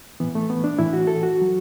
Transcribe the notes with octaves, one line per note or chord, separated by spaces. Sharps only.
A2 E3 B3
A3
B3
D4
A2 E3 E4
F#4
A4
F#4
F#3